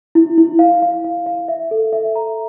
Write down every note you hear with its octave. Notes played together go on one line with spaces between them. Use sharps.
E4
E4
F5
F5
F5
F5
E5
A4
E5
A#5